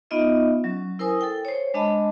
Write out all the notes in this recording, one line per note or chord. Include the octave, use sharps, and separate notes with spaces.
B3 D#4 F4 D#5 E5
F#3 C#4
E4 A#4 C5 G#5 D#6
A4 G5
C5 C#5
G#3 D4 D#5 A5 B5